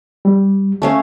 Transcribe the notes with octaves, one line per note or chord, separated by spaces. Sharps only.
G3
A3 C#4 F5